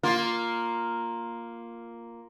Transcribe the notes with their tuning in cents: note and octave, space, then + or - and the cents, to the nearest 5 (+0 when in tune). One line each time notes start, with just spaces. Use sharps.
A#3 +0 F4 +0